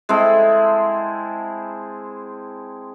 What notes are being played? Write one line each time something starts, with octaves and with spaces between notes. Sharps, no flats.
G#3 C4 E4 A4